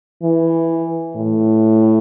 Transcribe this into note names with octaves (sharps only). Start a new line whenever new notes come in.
E3
A2